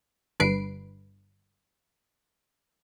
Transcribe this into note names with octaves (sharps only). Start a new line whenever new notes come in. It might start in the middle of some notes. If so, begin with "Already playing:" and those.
G1 G2 D3 B4 C7 D7